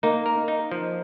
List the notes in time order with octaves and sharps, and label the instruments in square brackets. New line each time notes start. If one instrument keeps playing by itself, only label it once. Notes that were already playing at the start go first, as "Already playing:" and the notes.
[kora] A#3 [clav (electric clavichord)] D#4
[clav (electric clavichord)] A#4
D#4
F3